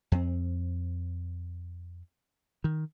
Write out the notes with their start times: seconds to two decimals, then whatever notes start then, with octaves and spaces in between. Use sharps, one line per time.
0.12 F2 C4
2.64 D#3